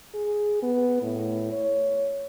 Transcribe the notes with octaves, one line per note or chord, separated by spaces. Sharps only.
G#4
B3
A2
C#5